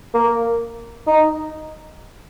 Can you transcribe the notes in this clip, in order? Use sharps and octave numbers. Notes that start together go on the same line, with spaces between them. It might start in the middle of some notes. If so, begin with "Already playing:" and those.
A#3
D#4